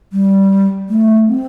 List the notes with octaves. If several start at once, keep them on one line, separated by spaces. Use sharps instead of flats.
G3
A3
C4